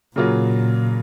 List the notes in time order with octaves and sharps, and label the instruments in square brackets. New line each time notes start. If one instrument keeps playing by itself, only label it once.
[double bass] A#2 [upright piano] C#3 F#3 A#3 F4